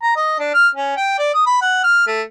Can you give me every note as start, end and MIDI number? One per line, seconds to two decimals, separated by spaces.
0.03 0.13 82
0.16 0.37 75
0.39 0.49 62
0.54 0.68 89
0.75 0.96 61
0.97 1.15 79
1.18 1.31 74
1.35 1.46 87
1.46 1.57 83
1.61 1.79 78
1.84 2.02 89
2.07 2.22 57